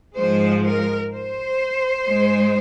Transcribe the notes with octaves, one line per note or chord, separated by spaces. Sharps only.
G#2 F3 G#3 C5
A#4
C5
G#2 G#3